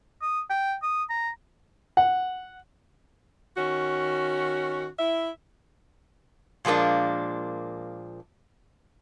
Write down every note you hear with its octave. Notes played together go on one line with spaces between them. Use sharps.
D#6
G5
D#6
A#5
F#5
D#3 C#4 F#4
E4 E5
A#2 F3 G#3 A#3 D4